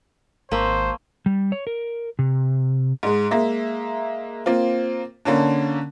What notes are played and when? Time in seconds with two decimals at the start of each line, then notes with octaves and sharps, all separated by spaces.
0.51 G#1 A#3 C5 E5 A5 C6 C#6
1.26 G3
1.52 C#5
1.67 A#4
2.19 C3
3.03 G#2 G#3
3.31 G#3 A#3 E5
4.46 A#3 C4 F4
5.25 D3 A#3 C#4 D4